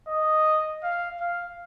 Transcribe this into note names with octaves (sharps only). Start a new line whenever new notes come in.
D#5
F5
F5